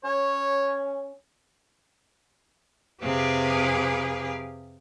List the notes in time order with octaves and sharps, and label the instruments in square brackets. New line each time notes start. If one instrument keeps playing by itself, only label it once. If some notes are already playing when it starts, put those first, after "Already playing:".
[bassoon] C#4 [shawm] C#5
[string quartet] F2 C3 G4 G#4 B4 F5